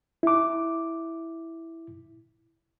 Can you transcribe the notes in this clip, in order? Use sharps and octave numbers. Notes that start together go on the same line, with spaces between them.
E4 D6